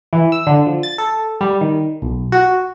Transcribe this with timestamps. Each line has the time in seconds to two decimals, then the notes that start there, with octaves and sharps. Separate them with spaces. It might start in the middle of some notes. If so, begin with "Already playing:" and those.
0.13 E3
0.32 E6
0.47 D3
0.66 F3
0.83 A6
0.98 A4
1.41 G3
1.61 D#3
2.02 B1
2.32 F#4